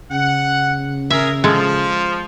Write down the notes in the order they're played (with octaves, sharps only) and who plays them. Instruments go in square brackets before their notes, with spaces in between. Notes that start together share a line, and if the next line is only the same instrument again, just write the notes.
[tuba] C#3 [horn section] F#5
[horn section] G#4 A#4 [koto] E5
[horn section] F3 [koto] G#3 A4